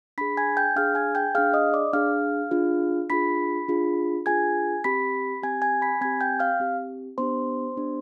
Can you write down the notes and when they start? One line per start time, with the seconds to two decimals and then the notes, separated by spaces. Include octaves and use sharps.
0.18 D4 G#4 B5 B6
0.37 G#5 G#6
0.57 G5 G6
0.76 D4 G#4 F5 F6
0.95 G#5 G#6
1.15 G5 G6
1.35 D4 G#4 F5 F6
1.54 D#5 D#6
1.73 D5 D6
1.93 D4 G#4 F5 F6
2.51 D4 F4 G#4
3.10 D4 F4 G#4 B5 B6
3.68 D4 F4 G#4
4.26 D4 F4 G#4 G#5 G#6
4.84 C4 G4 B5 B6
5.42 C4 G4 G#5 G#6
5.62 G#5 G#6
5.82 B5 B6
6.01 C4 G4 G#5 G#6
6.21 G5 G6
6.40 F5 F6
6.60 C4 G4
7.18 B3 D4 G4 C5 C6
7.76 B3 D4 G4